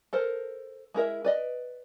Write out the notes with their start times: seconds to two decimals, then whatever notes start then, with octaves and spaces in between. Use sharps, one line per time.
0.13 A4 A#4 C5
0.94 G#3 E4 A#4 E5
1.25 B4 D5 D#5